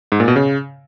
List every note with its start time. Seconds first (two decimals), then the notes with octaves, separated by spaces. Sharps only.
0.12 G#2
0.20 A#2
0.28 B2
0.36 C#3